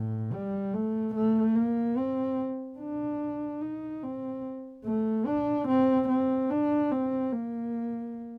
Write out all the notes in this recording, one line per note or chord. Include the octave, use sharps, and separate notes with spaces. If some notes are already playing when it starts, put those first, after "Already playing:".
Already playing: A2
G3
A3
A3
A#3
C4
D4
D#4
C4
A3
D4
C4
C4
D4
C4
A#3